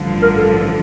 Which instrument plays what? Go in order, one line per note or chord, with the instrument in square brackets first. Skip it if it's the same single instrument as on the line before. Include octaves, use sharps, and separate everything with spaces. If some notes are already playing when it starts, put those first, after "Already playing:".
Already playing: [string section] A1 G2 D3 F3
[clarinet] A#4
A4